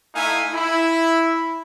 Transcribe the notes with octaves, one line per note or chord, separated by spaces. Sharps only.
A3 D#4 E4 E5 F5 G#5
E4